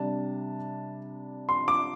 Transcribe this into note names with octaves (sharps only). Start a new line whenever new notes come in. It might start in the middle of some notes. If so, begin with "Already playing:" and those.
Already playing: C3 G3 D4 A5
C6
D6